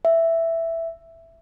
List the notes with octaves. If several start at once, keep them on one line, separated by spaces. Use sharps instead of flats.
E5